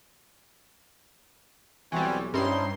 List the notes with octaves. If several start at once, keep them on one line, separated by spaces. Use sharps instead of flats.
B1 E3 G3 C4 F#4 G#5
G2 C#4 D#4 E4 C5 C6